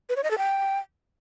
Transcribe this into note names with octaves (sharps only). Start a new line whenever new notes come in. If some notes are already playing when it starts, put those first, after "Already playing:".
B4
C#5
D#5
A4
G5